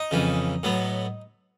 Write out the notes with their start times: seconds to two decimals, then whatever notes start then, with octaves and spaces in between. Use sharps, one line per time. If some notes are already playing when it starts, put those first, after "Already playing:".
Already playing: D#4
0.11 F2 C#3 E3
0.63 A2 F#3 B3